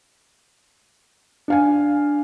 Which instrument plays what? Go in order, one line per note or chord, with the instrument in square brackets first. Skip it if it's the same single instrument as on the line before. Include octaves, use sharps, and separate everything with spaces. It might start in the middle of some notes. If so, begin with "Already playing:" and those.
[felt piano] D4 F5 G#5